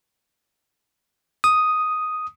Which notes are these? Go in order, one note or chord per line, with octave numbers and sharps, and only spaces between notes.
D#6